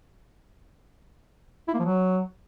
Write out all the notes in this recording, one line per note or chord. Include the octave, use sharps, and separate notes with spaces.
E4
A#3
F3
F#3